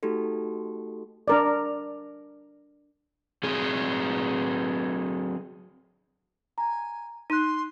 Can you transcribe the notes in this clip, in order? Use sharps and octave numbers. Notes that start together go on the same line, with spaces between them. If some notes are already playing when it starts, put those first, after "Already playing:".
A3 D#4 F#4 G4 A4
D4 A#4 D5
F#3 C4 G#4
G#5 A#5
D#4 C6 F#6 D#7